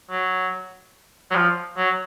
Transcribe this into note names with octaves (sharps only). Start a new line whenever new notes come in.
F#3
F#3
F3
F#3